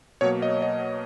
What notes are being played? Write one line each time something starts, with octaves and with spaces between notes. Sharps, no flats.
B2 F#3 A#3 C#5
D#5
D#5